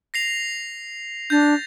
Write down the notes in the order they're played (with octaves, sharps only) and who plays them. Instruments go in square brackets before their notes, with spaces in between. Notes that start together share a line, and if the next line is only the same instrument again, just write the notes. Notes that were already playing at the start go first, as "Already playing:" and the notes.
[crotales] A#6 C7 F7
[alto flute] D4 [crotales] G6 A6